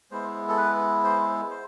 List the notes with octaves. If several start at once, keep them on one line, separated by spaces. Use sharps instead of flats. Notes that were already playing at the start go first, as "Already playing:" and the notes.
G#3 B3 E4 C5
A4
B4
C5
C5